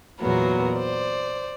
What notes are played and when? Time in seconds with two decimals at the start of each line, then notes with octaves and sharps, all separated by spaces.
0.20 E2 A#2 F#3 B3 A#4
0.77 C5 D5